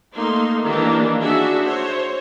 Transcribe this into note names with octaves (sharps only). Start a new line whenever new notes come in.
A3 A#3 D#4 C6
D#3 E3 A#3 D4 G4
D4 F#4 G#4 E5
C5 C#5